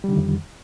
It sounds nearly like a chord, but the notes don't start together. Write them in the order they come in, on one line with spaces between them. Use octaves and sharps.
G3 D3 D#3 F2